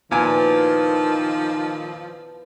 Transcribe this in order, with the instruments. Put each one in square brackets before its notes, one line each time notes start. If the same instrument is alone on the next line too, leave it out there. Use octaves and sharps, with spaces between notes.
[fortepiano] A#2 G#5 [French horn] D#3 [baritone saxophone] F3 [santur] B3 E4 F#5